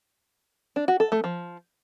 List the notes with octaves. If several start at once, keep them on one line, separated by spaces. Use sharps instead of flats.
D4
F#4
A4
A3
F3